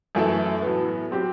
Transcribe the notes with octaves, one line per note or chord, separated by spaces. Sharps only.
F#2 E3 A3 E4 A4
A2 F#3 B3
F#3 C4 G4